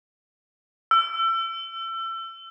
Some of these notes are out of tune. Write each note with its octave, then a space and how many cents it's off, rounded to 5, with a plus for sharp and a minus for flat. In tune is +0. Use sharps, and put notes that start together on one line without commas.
E6 +30